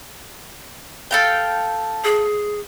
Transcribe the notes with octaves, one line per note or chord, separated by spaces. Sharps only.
A4 F5 G5
G#4